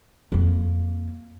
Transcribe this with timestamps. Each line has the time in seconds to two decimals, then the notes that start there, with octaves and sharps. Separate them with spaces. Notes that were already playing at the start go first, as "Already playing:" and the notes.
0.32 F2 A#3